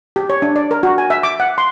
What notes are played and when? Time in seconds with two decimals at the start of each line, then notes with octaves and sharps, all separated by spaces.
0.16 G4
0.30 C#5
0.42 D4
0.56 D5
0.71 A#4
0.83 F#4
0.98 G#5
1.10 E5
1.23 D6
1.40 F#5
1.58 C6